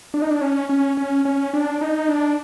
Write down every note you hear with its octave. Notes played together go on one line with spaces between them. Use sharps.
D4
D#4
D4
C#4
C#4
C#4
C#4
D4
D#4
D4